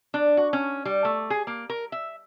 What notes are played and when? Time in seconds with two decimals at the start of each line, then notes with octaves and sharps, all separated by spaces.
0.14 D4
0.37 F#4
0.53 C#4
0.85 G3
1.05 A3
1.30 G#4
1.47 A#3
1.70 A#4
1.92 E5